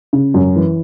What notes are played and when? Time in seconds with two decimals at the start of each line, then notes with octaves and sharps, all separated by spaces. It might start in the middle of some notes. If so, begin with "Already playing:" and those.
0.13 C#3
0.34 F#2
0.56 E3